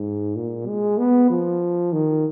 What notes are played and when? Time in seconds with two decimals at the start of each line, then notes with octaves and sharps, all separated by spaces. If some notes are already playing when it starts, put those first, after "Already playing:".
Already playing: G#2
0.36 A#2
0.67 G#3
0.98 B3
1.30 F3
1.93 D#3